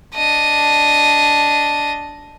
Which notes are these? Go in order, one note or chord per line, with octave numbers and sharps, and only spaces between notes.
D4 D#5